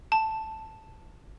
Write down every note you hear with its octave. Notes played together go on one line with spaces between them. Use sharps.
A5